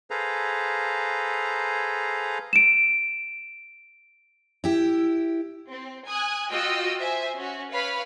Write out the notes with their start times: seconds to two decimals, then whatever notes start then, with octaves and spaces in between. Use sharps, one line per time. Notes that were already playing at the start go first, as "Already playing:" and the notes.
0.10 G#4 A4 B4 C5 F5 A#5
2.53 D7 E7
4.64 E4 G4
5.69 C4
6.09 G#5 D#6 F#6 G#6
6.51 F4 F#4 D#5 G5 D#6 E6
7.00 C5 E5 G#5
7.36 C#4 F#4
7.72 B4 C#5 F5 B5